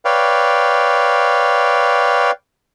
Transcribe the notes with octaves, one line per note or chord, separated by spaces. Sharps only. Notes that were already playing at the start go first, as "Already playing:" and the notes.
B4 C#5 D5 F5 G5